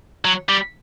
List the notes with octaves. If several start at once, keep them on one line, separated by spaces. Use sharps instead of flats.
F#3
G3